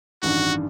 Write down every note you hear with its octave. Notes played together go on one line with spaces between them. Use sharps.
A1 G2 D#3 F#4